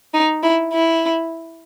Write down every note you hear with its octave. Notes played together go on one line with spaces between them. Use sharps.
D#4
E4
E4